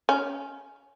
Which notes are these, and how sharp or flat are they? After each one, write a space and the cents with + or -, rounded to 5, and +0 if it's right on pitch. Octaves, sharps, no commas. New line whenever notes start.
C#4 +15